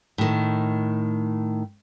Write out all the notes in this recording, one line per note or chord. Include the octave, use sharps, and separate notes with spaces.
A2 D#3